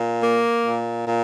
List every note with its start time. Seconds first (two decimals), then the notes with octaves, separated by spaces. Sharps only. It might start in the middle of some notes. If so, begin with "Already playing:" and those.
Already playing: A#2
0.24 A#3
0.64 A#2
1.05 A#2